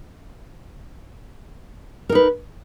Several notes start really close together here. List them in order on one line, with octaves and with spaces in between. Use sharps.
A#4 D#4 B4